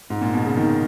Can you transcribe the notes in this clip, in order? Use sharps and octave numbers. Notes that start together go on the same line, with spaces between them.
G#2
A#2
B2
C#3
D#3